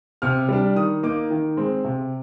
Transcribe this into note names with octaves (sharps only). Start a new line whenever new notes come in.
C3 F6
G3 D4
D#3 D#6
A#3 D#4 D6
D#3
G#3 C4
C3